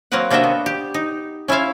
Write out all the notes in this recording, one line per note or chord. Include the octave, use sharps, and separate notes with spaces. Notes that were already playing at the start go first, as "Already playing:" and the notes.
F#3 A#3 C4 A#4 B4 F#5
C3 A#3 D4 F#4 D#5 E5
B3
G4
D#4
C#4 E4 F4 E5 F5